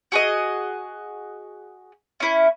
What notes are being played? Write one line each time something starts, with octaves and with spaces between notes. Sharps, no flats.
F#4 G#4 A4 D#5
C#4 E4